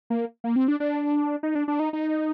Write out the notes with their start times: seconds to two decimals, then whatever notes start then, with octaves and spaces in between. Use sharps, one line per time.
0.10 A#3
0.44 A#3
0.56 C4
0.68 D4
0.80 D4
1.43 D#4
1.55 D4
1.68 D4
1.80 D#4
1.93 D#4